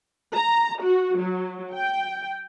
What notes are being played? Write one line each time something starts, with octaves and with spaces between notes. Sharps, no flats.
A#5
F#4
F#3
G5